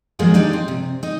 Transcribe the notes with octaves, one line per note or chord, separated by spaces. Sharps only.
D#3 F3 F#3 G#3 A#3 G#4
D4 D#4 G4 D5
C4
C3
D#4 D#5